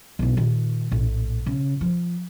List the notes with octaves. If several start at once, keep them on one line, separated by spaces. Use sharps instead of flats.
B1 E4
A#2 D#3
A#1 A2
C#3
F3